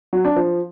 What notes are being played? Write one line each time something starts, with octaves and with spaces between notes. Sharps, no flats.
F#3
D4
F3